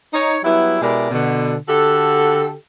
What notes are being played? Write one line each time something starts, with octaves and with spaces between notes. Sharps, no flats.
D#4 C#5
F#3 G3 B3 E4
B2 G#3 E4 G4 A#4 D5
B2 D3
D3 F#4 G4 A4